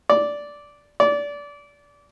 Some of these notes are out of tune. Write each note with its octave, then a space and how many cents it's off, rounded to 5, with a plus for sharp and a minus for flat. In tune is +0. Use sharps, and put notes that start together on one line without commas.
D5 -10
D5 -25